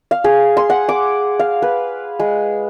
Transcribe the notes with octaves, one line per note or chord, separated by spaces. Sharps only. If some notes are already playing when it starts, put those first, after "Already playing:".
F5
G#4
C6
F#5
D6
F5
B4
G#3